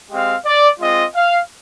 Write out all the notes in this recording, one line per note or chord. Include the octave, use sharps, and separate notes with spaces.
G#3 C4 G4 F5
D5
G#3 C4 F4 D#5
F5